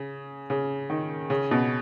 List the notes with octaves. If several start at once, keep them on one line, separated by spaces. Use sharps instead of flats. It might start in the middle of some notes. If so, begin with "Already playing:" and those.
Already playing: C#3
C#3
D#3
C#3
B2